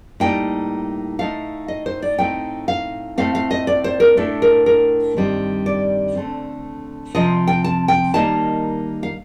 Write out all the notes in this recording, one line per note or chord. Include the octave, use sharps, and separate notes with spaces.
A2 G3 A#3 D#4 G5
A2 A3 D#4 F5
D#5
C5
D5
A2 F3 A3 C4 D#4 G5
F5
A2 A3 C4 F5
F5
D#5
D5
C5
A#4
A2 A3 D4 A4
A#4
A#4
G2 D#3 G3 C4
D5
D3 A3 C4
C3 F3 C4 D#5
G5
A5
G5
D#3 G3 A#3 D#4 A5
F5